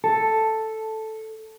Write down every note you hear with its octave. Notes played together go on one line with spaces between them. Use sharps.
A4